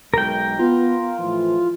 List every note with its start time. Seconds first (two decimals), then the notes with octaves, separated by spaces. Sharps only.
0.14 B1 G#3 A#4 G5
0.59 B3 F4
1.18 A2 E3 F3